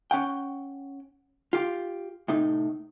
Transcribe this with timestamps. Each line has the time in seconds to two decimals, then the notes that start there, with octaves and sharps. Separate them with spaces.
0.11 C#4 F#5 G5
1.53 F4 G4
2.28 A2 C3 D#4